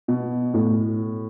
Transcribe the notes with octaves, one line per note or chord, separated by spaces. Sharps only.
B2
A2